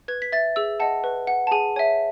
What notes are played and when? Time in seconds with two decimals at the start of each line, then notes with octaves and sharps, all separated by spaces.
0.08 B4 G#6
0.22 B6
0.32 E5 A6
0.56 G#4 E6
0.80 D#5 F#5 A5
1.04 B4
1.27 F#5
1.47 A5
1.52 G#4 G#5
1.76 C#5 E5 G#5